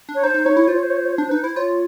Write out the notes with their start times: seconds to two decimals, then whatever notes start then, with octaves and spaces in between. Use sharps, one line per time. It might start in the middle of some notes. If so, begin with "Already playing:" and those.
0.09 D4
0.15 C#5
0.23 D#4 C5
0.34 D#4
0.45 D#4 C#5
0.57 E4
0.68 F4 C5
0.75 C#5
0.83 C5
0.90 C#5
0.97 C5
1.05 C#5
1.12 C5
1.18 D4
1.29 D#4 B4
1.42 E4 C5
1.56 F4 C#5